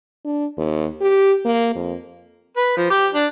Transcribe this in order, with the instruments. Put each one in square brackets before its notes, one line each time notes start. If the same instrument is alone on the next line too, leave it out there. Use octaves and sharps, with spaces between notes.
[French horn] D4
D#2
G4
A#3
F2
[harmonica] B4
F3
G4
D4